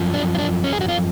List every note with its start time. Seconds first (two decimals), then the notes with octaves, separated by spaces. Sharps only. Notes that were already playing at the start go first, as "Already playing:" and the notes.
Already playing: F#2 F3
0.14 D4
0.35 F4
0.39 D4
0.64 C#4
0.73 G#4
0.81 F#4
0.89 F4